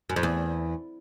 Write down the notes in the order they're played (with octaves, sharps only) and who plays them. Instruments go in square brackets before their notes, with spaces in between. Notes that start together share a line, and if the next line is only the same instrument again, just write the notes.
[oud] F#2
F2
E2